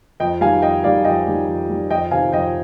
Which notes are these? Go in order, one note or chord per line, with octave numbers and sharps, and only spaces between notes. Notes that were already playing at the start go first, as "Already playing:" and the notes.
F2 D#5 G5
D#3 G3 F5 G#5
F2 D#5 G5
D#3 G3 D5 F5
F2 D#5 G5
D#3 G3
F2
D#3 G3
F2 D#5 G5
C3 D#3 F5 G#5
F2 D#5 G5